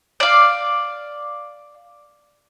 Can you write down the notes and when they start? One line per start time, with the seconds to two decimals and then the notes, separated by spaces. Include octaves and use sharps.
0.20 D5 F5